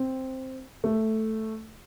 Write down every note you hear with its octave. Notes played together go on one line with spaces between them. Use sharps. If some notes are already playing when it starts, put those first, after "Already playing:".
Already playing: C4
A3